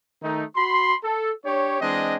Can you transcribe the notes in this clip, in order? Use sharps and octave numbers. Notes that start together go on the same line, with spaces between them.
D#3 A3 D#4
F#4 B5 C6
A4
D4 G4 C#5
E3 G#3 C4 D4 D#5